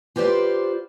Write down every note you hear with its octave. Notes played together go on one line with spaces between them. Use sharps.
F4 G4 B4 C5 D5